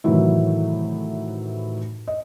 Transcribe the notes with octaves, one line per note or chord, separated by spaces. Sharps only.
A2 C3 D#3 E3 F#3 E4
D#5